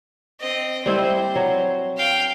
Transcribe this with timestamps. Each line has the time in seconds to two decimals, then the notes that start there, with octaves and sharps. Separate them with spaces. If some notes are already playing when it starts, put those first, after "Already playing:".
0.40 C4 D#5
0.86 G3 C4 E4 C5
1.36 F#3
1.97 F5 G5